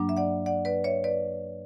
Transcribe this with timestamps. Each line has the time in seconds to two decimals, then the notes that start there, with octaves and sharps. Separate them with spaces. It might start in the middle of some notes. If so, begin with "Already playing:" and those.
Already playing: G2 F#3 A#3 D4
0.09 E5
0.17 D5 F#5
0.46 D5 F#5
0.65 B4 D5
0.84 C#5 E5
1.04 B4 D5